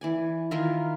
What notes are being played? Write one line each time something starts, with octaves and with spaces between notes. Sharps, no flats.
E3 D5 G#5
D#3 E4 F4 A#4